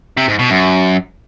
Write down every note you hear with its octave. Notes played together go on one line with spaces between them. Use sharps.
C3
G#2
B2
F#2